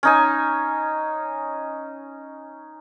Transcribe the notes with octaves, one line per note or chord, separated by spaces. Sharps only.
C#4 D#4 G#5